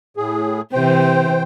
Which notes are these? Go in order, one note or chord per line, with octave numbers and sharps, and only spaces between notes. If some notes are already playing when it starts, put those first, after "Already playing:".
A2 G#4
C3 E3 C5 G5